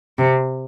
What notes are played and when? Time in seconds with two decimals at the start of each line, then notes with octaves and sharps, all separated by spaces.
0.18 C3